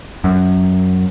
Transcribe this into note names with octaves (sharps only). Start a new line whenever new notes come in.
F#2